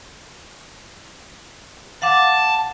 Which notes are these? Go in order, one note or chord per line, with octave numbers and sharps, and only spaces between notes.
F5 F#5 A5 D6